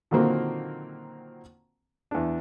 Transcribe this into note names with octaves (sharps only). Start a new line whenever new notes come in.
A#2 D3 D#3 F#3 A#3 C4
E2 D4